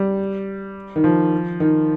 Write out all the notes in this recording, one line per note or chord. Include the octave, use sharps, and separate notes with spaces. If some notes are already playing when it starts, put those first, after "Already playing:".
Already playing: G3
D#3
F3
D#3